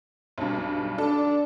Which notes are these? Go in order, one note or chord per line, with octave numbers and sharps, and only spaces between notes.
B1 G2
D4 A4